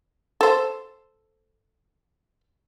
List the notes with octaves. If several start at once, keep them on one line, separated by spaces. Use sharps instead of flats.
A4 C5